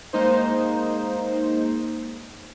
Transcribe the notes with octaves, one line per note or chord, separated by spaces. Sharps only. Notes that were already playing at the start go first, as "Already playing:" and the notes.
G#3 A#3 D#4 C5